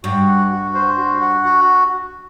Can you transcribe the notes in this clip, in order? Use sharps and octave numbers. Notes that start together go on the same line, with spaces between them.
G2 F#4
F#5
F#4
C5
F#4
F#5
F#4